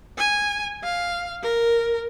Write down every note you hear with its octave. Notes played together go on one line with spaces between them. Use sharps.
G#5
F5
A#4